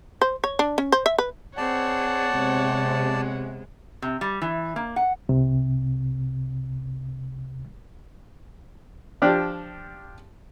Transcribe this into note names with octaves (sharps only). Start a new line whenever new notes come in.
C5
C#5
D4
C#4
C5
E5
B4
C4 G#4 C#5 D5 F#5 A5
C3 G#3 B3
C3
G3
E3
A#3
F#5
C2 C3
F3 D4 G4